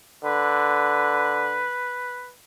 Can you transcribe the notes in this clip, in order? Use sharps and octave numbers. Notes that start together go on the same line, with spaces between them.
D3 B4